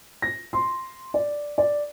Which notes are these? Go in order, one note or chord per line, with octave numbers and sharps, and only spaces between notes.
A#6
C6
D5
D5